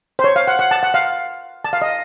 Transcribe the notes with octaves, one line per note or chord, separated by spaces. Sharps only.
C5
C#5
F5
F#5
F#5
A5
F#5
F5
A5
F5
D#5